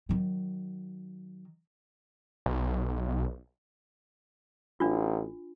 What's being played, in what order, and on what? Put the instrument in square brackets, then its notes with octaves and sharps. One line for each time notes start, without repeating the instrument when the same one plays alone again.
[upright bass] D#3 F#3
[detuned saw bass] B1
[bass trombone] A1 [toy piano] D4 F4